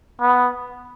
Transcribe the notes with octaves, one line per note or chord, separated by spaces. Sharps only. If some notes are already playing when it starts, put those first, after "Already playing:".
B3